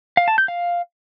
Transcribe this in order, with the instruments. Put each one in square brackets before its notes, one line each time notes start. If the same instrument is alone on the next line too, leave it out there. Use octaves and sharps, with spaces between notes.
[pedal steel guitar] F5
A5
G6
F5